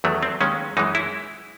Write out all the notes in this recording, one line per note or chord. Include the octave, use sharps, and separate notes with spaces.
E2 D#3 F#3 A3
C4
D#2 D#3 G#3 C#4
F#2 E3 G#3 D#4
E4